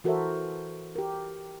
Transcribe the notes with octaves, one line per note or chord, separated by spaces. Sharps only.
E3 F#4 A4 A#4 C5 E5
G4 A#4